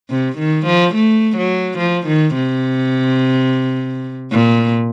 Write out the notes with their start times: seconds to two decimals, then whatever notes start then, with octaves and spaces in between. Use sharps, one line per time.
0.10 C3
0.38 D#3
0.66 F3
0.95 A3
1.37 F#3
1.79 F3
2.07 D#3
2.35 C3
4.32 A#2